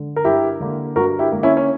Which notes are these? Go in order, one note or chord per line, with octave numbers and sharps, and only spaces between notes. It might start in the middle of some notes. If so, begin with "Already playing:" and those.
Already playing: D3
A#4
G2 E4 G4
D3 A#3
G2 F#4 A#4
E4 G4
D3 A#3
C#4 E4
C#4